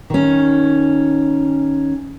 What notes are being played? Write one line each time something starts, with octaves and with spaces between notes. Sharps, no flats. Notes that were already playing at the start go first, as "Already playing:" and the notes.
D#3 C#4